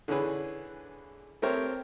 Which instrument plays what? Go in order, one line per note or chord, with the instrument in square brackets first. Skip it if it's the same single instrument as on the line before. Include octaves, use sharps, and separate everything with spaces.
[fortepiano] D3 E3 C#4 G#4 B4
A3 C4 G4 A#4 C5 C#5